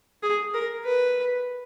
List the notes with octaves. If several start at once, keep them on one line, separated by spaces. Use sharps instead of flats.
G#4
A#4
B4